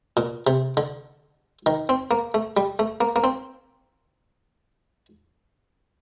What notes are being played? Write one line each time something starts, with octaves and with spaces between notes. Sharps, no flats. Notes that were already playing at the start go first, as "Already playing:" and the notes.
A#2
C3
D3
D#3
C4
A#3
A3
G3
A3
A#3
A#3
C4